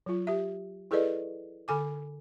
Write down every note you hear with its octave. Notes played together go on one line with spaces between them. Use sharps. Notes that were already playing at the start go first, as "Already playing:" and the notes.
F#3 F4
G4 E5
E4 G#4 A4 B4 D5 D#5
D3 A4 G#5 D6